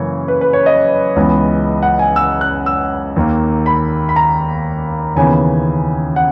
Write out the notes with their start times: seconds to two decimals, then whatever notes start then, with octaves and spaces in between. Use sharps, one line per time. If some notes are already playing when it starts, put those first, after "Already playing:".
Already playing: F#2 C#3 E3 A#3 C#5
0.28 B4
0.41 B4
0.53 C#5
0.66 D#5
1.16 C#2 C#3 E3 B3
1.83 F#5
1.99 G#5
2.16 E6
2.41 F#6
2.66 E6
3.16 D#2 D#3 A#3
3.66 B5
4.09 B5
4.16 A#5
5.16 D#2 C#3 E3 B3 G#5
6.16 F#5